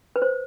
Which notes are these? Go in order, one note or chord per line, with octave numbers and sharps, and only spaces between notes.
B4
C5